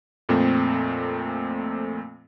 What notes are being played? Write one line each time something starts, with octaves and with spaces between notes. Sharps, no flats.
F2 A#2 A3 C4